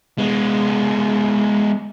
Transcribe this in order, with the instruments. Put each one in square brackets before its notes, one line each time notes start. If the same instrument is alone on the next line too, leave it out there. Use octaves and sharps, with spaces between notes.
[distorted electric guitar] G#3 B3